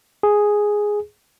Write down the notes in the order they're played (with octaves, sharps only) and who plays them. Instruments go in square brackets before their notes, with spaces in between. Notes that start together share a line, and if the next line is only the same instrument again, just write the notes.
[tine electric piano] G#4